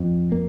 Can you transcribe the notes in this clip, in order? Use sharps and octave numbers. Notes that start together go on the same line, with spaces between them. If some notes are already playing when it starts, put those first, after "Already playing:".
Already playing: F2
A#3